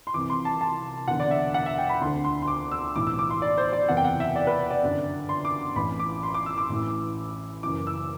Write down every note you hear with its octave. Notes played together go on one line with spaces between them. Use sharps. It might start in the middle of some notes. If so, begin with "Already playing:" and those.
C6
C2 C3 E3 D6
C6
A5
A5
E1 E2 D3 F#5
D5
E5
F#5
E5
G5
B5
D2 D3 C6
C6
C6
D6
E6
B1 A2 E3 D6
E6
D6
C6
D5
C5
D5
F#1 E2 C3 E3 F#5
G5
F#5
E5
D5
B4
D5
G1 F#2 D3
C6
D6
A1 A2 E3 B5
D6
C6
D6
E6
D6
A1 A2 E3
F#1 F#2 E3 D6
E6